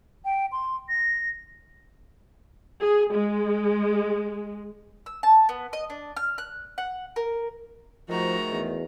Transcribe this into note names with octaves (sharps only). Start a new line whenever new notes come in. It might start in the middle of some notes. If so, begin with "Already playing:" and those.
G5
C6
A#6
G#4
G#3
E6
A5
B3
D#5
D4
F6
F#6
F#5
A#4
G#2 D#3 F3 A3 F#4 A#5
E2